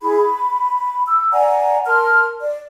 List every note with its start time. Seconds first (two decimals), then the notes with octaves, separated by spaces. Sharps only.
0.01 E4 G#4 B5
0.16 B5
1.05 E6
1.32 D5 F#5 G#5 A#5
1.86 A#4 A5 C6 F6
2.40 D5